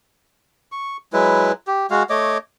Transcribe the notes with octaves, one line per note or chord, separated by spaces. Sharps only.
C#6
F#3 G#3 E4 B4
G4
G#3 F#4 F5
A3 C#5 D#5 D6